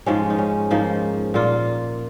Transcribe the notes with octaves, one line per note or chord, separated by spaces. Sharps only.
G#2 F3 G#3 C#4
D#4
C#4
G#2 F3 A#3 D#4
A#2 A#3 F4